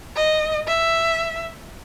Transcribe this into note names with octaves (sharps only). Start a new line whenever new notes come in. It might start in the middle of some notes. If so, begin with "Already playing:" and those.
D#5
E5